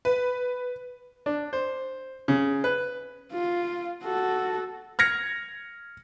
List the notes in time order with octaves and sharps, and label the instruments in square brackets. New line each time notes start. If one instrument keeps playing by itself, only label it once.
[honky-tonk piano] B4
[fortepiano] D4
C5
C#3
B4
[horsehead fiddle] F4
F#4 A4
[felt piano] F6 G#6 A#6 C#7